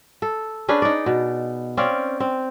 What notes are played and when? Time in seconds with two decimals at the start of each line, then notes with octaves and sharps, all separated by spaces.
0.22 A4
0.68 C#4 D4 G#4 B4
0.82 D#4 D5
1.06 B2
1.77 C4 C#4 D5 F5
2.20 C4